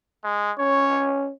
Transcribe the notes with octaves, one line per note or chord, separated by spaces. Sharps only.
G#3
C#4 C#5